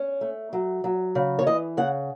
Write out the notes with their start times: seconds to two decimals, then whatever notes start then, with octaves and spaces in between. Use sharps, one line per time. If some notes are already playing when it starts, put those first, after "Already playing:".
Already playing: C#4
0.21 A3
0.53 F#3
0.84 F#3
1.15 C#3
1.39 C#5
1.47 E3 D#5
1.77 C#3 F#5